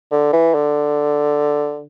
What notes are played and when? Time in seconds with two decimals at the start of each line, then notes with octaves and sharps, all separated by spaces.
0.12 D3
0.33 E3
0.54 D3